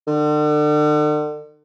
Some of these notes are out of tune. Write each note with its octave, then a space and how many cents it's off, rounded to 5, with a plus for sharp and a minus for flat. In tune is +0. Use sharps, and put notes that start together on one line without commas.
D3 +40